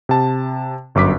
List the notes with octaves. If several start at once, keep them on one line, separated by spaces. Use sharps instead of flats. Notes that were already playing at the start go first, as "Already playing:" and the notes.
C3 A5
G1 F#2 D6 B6